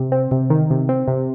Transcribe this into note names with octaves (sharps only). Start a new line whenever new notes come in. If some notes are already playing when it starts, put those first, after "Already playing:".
Already playing: C3
C4
C3
D#3
C3
C4
C3